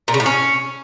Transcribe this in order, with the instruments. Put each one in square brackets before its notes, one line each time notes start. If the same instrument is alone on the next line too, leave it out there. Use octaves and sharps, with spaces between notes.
[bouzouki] A#2
C#3
A2
C#4